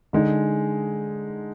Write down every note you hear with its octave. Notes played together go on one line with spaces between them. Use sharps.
D3 G#3 D#4 G#4